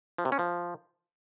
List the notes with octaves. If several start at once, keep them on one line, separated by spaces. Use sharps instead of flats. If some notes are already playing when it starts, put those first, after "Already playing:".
F3
C3
C#4
F3